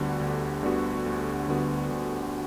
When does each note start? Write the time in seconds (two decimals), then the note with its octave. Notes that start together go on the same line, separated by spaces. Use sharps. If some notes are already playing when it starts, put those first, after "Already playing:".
Already playing: D2 D3 G3 B3 F#4
0.21 D2
0.63 D3 G3 B3 F#4
1.06 D2
1.48 D3 G3 B3 F#4
1.91 D2